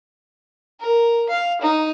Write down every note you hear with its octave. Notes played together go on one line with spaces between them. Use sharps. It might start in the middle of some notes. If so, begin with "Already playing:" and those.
A#4
F5
D#4